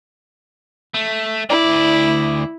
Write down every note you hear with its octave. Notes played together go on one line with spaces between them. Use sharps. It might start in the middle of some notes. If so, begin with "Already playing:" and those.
A3
D2 E4 D5